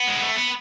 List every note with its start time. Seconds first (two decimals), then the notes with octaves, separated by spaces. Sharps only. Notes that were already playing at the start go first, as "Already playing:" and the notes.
Already playing: B3
0.08 G#3
0.23 A3
0.36 B3